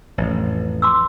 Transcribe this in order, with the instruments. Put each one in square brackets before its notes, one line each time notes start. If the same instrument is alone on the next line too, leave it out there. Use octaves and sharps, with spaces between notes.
[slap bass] A1 F2
[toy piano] C6 D6 E6